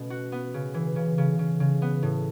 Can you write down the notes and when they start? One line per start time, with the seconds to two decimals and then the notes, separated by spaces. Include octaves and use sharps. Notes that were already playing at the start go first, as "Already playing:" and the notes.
Already playing: B2 A3 C#4
0.10 F#4
0.32 B3
0.54 C#3
0.74 E3
0.96 C#3
1.18 C#3
1.39 C#3
1.60 C#3
1.82 B3
2.03 A2